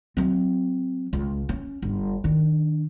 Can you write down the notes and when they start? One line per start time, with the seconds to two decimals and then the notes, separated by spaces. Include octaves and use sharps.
0.17 F#3 C4
1.13 C#2
1.49 C#4
1.82 G1
2.24 D#3 D4